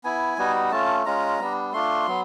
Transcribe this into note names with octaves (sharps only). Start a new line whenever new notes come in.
B3 E4 G#5
G3 B3 D#4 F#4
A3 C#4 F4 A5
G#3 C#4 F4 A#5
G3 B3 D4
A3 D4 F4 C6
F#3 B3